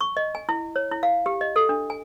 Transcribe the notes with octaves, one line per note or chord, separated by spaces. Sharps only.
C#6
D#5
G#5
E4
C#5
E4
F5
G4
D#5
A4
D4
G#5